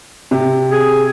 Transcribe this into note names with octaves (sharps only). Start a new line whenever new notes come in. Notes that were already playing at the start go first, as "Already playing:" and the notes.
C3
G#4